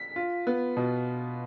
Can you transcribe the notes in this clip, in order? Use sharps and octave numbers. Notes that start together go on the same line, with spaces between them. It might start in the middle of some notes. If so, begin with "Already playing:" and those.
Already playing: B6
F4
B3
B2